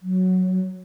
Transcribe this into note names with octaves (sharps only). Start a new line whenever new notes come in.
F#3